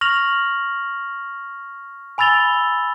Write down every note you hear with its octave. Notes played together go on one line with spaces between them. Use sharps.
C#6 F6 A#6 F7 F#7
G#5 B5 E6 A6 F7 G7